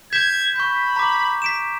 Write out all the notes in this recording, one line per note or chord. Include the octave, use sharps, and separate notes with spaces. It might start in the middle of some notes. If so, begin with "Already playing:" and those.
G6 G#6 B6 E7
B5 C#6 G6
A#5 D6
B6 D7 E7